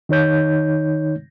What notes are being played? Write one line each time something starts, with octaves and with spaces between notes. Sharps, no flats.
D#3 D#4 C#5 G6